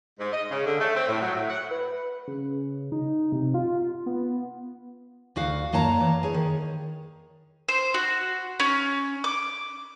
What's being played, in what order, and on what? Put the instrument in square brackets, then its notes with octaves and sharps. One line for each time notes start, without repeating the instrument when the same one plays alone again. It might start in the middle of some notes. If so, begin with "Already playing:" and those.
[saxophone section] G#2
D#5
C#3
D3
A3
C4
A2
F#3
A2
F#5
[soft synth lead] B4
C#3
D#4
C3
F4
B3
[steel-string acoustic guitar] D2 F#4 F5
F#2 A#3 C#5 A5 A#5
E3
G#4 C#5
D#3
[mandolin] C5
F#4
C#4
D6